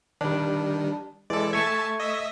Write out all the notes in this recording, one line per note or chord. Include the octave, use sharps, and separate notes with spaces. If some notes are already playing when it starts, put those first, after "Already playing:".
D#3 G3 D4
E3 G#3 A4 D5
A3 E5 G#5 A5 C#6 G#6
D#5 E5